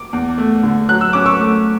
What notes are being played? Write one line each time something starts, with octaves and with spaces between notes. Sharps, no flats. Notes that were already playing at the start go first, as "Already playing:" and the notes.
Already playing: D6
E2
A3
D3
F#3 F#6
E6
C#4 D6
C#6 E6
A3